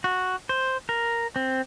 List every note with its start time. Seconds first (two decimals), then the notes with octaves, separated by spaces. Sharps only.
0.04 F#4
0.49 C5
0.89 A#4
1.36 C4